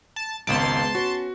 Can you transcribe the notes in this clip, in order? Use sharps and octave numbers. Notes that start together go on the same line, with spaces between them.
A5
G#1 C#2 G#3 B3 A5 C6 D7
C#4 F#4